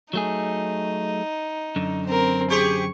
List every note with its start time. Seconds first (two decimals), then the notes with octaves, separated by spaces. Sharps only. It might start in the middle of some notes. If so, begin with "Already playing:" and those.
0.13 F#3 A3 D#4 G#4
1.76 F#2 D3
2.07 C4 A#4
2.50 G4 G#4 C5 C#6